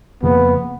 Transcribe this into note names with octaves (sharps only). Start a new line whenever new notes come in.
F2 C#3 F3 A#3 B3